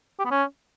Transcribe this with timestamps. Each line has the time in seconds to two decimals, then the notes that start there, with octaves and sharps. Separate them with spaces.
0.19 G4
0.25 B3
0.31 C#4